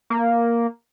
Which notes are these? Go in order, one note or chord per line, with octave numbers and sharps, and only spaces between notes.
A#3